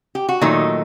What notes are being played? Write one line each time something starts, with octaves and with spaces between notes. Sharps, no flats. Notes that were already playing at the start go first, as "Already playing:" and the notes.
G4
F#4
A#2 D#3 F#3 A3 D#4